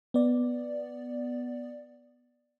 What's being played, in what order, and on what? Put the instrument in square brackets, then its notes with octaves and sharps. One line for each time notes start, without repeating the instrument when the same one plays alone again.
[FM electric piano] B3 D5